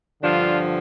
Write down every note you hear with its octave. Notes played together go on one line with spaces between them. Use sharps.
G2 D3 F3 D4 F4